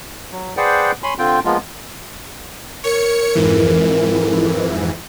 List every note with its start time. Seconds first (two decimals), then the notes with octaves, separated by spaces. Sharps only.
0.31 F#3
0.57 G#4 B4 C5 D5 F#5 G5
1.03 C#5 G#5 B5 C6
1.18 D3 C4 F4 G5
1.45 F3 G#3 A#3 B3 F4
2.84 A#4 C#5 C#7
3.35 F2 G#2 E3